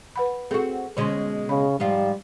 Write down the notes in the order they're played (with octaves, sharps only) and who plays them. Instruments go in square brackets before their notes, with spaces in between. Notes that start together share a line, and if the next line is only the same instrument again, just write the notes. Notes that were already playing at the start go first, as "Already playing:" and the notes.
[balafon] B4 F#5 B5
[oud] C4 F#4 [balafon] G#4 A4
[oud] B2 G#3 C#4 [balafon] D3 C6
[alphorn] C#3 [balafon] B5
[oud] G#2 F3 F4 [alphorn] G3